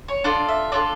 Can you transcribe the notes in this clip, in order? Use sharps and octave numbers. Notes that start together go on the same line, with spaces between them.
C#5
D4 F4 A4 D5
E5
D4 F4 A4 D5